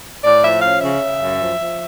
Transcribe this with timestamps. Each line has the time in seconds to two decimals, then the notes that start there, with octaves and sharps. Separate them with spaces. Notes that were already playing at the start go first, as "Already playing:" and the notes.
0.24 A2 D5
0.43 F3 E5
0.62 C#4 F5
0.82 C#3 E5
1.01 C#3
1.19 F#2
1.39 F3
1.58 F3